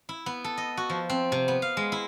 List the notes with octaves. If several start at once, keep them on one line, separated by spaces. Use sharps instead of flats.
E4
B3
A4
D#5
F#4
F3
C4
C3
B3
F5
G#3
E4